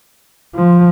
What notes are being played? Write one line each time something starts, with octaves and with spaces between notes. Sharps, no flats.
F3